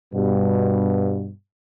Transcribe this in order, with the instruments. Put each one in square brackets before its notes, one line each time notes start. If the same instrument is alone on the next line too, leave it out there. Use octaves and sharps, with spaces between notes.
[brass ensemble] G2 B2